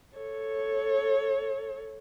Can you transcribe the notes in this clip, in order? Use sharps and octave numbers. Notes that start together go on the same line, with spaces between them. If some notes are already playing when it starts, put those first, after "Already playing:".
A4 C#5